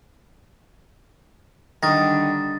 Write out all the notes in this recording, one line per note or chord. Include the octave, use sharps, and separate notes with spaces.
D3 D#3 G3 D#6 A6 A#6